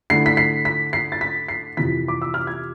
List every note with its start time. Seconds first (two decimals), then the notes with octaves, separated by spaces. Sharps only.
0.10 D3 A3 E4 C7
0.26 B6
0.37 C7
0.65 B6
0.93 C7
1.12 A6
1.21 B6
1.48 C7
1.77 F2 C3 E3 B6
2.08 D6
2.22 E6
2.34 F6
2.47 G#6